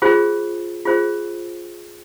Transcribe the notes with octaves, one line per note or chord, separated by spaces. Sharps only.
F4 G#4 C5
F4 G#4 C5